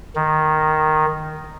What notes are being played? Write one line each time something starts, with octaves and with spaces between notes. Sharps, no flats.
D#3